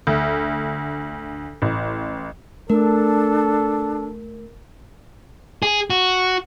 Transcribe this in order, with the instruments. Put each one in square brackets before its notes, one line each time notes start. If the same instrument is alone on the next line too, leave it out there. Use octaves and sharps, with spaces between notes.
[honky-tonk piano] D2
A1
[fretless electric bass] A3 [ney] D4 [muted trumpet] A4 [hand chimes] A#4
[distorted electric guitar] G#4
F#4